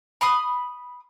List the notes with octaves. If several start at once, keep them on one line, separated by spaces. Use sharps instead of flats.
B5 C6 D#6